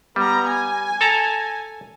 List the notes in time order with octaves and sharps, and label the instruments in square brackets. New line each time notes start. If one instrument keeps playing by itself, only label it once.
[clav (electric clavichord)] G3 [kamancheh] B3 A#5
[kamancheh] G#5
[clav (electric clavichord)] A4 A5 A#5